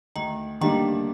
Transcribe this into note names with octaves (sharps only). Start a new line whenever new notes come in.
D2 D#3
D3 D#3 G3 A#3 D4